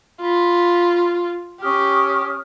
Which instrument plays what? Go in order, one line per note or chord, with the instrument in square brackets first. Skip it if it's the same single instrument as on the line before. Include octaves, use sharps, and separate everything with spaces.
[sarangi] F4 [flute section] B5
[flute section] C#4 D#6 F6 [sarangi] G4